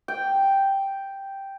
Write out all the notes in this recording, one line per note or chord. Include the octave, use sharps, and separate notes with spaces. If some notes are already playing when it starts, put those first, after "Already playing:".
G5